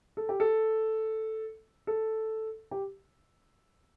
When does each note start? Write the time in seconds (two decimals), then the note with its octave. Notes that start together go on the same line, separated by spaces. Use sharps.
0.17 A4
0.29 G4
0.40 A4
1.87 A4
2.71 G4